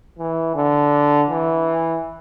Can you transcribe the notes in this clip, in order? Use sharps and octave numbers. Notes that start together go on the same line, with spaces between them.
E3
D3
E3